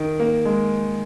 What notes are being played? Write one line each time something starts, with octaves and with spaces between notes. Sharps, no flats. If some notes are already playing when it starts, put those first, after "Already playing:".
Already playing: D#3
A#3
G#3